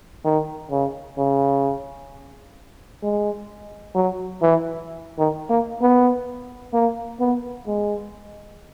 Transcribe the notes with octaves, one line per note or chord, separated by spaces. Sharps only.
D#3
C#3
C#3
G#3
F#3
E3
D#3
A#3
B3
A#3
B3
G#3